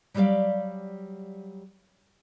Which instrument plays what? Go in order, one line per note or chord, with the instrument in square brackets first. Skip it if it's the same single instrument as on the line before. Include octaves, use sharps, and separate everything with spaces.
[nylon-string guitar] F#3 G3 G4 A#4 D5 F5